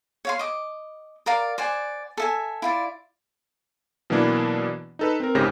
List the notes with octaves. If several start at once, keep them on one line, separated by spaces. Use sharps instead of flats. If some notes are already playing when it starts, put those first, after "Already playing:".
C#5 F5 C6
D#5 D6
A#4 D5 F5
C5 D5 F#5 G#5
A4 E5 G#5
E4 F4 D5
B2 E3 F#3 A#3 D4 E4
D#4 A4 B4
C4 A#4
G1 G#2 C#3 G4 C5 A#6